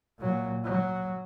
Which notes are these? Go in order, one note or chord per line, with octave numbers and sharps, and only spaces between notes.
A#2 F#3
F#3